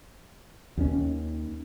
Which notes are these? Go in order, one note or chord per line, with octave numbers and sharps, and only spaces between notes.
D#2 D#3 C#4